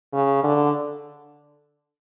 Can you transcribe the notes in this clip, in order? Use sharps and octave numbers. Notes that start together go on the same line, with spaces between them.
C#3
D3